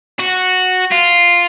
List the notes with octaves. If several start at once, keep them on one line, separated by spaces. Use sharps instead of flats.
F#4
F4